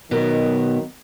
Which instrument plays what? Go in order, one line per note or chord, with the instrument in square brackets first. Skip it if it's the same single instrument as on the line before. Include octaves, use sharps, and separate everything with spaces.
[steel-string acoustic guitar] B2 B3 A#4 [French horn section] D#3 F#3